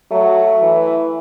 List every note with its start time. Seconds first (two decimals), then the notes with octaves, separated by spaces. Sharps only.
0.11 F#3 A3
0.62 E3